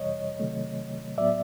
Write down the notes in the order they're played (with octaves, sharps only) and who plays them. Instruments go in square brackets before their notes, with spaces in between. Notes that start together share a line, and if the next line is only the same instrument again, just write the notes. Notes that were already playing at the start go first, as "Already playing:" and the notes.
Already playing: [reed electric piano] F2 C3 E3 G3 C#5 D#5
C3 D#3 F#3 A3
A2 F#3 B3 D5 E5